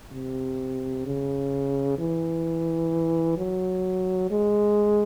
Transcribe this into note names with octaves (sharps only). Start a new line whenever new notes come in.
C3
C#3
E3
F#3
G#3